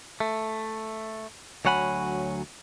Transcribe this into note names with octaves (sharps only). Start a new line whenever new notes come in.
A3
D2 F#3 C#5 F#5 G#5 B5